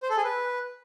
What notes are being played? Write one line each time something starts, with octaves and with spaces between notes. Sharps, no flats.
C5
A4
G#4
B4